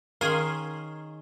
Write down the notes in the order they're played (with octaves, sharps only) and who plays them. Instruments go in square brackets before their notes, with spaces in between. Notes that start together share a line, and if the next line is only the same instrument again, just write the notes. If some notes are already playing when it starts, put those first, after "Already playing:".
[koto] D#3 C#4 G#4 [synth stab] A#4 F5 C6